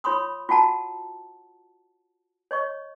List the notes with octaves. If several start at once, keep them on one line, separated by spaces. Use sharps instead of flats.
F4 C#5 B5 C6 D#6
F4 F#4 F#5 A5 A#5
C#5 D#5 C#6